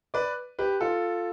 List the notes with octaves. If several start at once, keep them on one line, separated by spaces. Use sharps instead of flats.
B4 D5
G4 B4
F4 A4